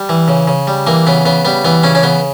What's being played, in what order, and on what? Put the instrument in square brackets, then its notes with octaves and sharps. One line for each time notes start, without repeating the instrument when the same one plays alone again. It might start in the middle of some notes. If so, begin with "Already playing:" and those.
Already playing: [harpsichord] G3
E3
C#3
C#3
G3
E3 A#3
C#3 B3
C#3 B3
G3 B3
E3 B3
C#3 C#4
C#4
C#3 B3